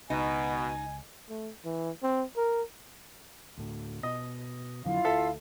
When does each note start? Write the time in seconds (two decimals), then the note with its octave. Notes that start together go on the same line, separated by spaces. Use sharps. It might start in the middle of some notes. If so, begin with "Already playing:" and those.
0.10 C#2 B2 D#4 G#5
1.29 A3
1.65 E3
2.03 C4
2.37 A#4
3.57 D2 A2
4.03 B2 D#5
4.85 F2 D3 F#3 E4 F4 F5
5.05 D2 A4 E5